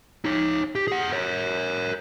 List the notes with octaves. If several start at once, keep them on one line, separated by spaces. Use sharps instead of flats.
D#4 C#5
G4
G#4 F#5
A#4 C#5